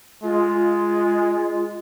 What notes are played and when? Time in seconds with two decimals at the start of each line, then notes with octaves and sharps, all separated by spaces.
0.23 G#3 F4